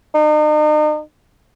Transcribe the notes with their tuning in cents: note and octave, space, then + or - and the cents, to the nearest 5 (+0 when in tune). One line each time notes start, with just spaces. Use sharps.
D#4 -40